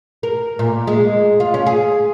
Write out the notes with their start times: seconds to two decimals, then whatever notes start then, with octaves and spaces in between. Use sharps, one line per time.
0.23 A#4
0.59 A#2
0.87 G#3
1.40 F4
1.54 C#4
1.66 G#4